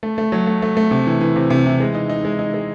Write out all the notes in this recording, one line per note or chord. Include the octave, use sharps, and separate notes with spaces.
A3
A3
F#3
A3
A3
A3
C3
E3
E3
C3
C3
E3
G#3
D#4
D#4
G#3
D#4
G#3